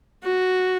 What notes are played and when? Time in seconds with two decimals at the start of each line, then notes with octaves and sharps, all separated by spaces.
0.24 F#4